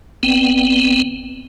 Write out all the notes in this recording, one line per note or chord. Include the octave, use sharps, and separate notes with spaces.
G1 B3 C4